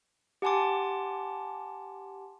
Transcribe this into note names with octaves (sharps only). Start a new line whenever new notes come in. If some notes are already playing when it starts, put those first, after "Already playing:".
G4 F#5 G#5 A5 C6 D6